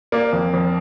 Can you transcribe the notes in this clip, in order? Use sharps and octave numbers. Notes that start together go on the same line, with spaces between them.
A#3 D5
F2
F2